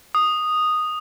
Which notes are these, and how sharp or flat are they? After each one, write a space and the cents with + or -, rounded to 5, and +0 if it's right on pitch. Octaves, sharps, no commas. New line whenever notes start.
D#6 -5